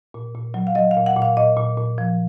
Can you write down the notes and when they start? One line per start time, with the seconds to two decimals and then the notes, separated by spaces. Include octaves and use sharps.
0.14 A#2
0.35 A#2
0.54 F#3
0.67 F5
0.75 F#3 D#5
0.91 F5
0.96 A#2
1.06 F#5
1.16 A#2
1.22 F5
1.37 A#2 D#5
1.57 A#2
1.77 A#2
1.98 F3